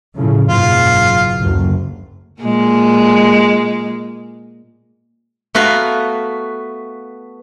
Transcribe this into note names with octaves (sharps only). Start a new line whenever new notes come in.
A2 C#3 F3
F#1 G#2 B2 F4
F#1 D2 F#3
A#2 G#3
A3 B3 F#4 F5 A#5